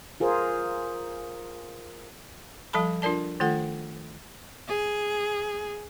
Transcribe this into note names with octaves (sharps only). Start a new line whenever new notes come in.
F4 G#4 A#4 C5
F3 G3 A4 A5 B5
D4 F4 A#4 D5 A5
D#3 A3 F4 A4 F#5
G#4